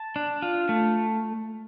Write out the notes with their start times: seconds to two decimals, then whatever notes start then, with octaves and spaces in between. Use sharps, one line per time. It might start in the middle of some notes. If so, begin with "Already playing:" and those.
Already playing: A5
0.16 D4
0.42 F4
0.69 A3